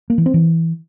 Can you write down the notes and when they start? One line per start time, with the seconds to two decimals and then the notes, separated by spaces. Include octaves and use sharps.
0.10 A#3
0.18 E3
0.26 C4
0.34 E3